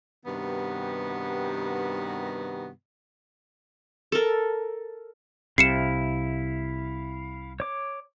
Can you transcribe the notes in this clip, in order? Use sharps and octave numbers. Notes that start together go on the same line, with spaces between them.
G2 C3 D#3 B3 D#4 F#4
A4 A#4
C2 C3 E4 F5 C7 C#7 E7
C#5 D6